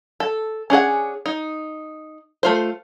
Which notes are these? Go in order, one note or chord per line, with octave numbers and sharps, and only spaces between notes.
A4
C#4 D4 G#4 F#5
D#4
A3 F4 C5